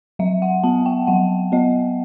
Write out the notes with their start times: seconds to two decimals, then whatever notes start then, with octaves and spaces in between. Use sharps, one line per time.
0.19 F#3 E5
0.42 F#5
0.63 B3 A5
0.86 G5
1.07 F#3 F#5
1.52 B3 D#5